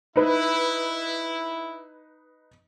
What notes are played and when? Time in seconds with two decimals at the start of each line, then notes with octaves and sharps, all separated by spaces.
0.16 D#4 E4 B4